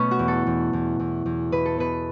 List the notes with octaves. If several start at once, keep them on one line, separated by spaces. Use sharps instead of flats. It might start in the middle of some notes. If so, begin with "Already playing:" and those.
Already playing: B2 A3 B3 C#4
F#4
E2
A4
E2
E2
E2
E2
B2 B4
A4
B2 B4